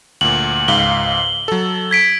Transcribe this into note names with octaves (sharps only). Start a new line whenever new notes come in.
D2 A#2 F#7
C#2 G#2 F5 G7
F#3 A4
G#6 B6 D7